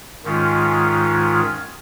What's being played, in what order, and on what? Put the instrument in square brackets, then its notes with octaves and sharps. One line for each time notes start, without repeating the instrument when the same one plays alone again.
[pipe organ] G#2 D#3 G#3 C#4 F4